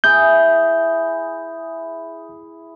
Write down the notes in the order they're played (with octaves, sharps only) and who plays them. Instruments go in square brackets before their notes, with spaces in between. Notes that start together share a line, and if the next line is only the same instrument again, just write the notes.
[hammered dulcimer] E4 G#4 [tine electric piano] G6